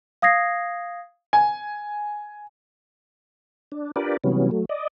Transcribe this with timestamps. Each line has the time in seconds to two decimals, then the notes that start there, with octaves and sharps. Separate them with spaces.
0.22 F5 D#6 G#6 A#6 C7
1.33 G#5
3.72 D4
3.96 D4 F4 G4 A#4 B4 D5
4.24 C3 E3 F#3 G3 B3 C#4
4.51 F#3 A3
4.69 D5 D#5